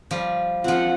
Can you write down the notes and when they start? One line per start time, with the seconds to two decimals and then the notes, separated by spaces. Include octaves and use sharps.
0.11 F3 G3
0.64 F3 C4 F4 F#5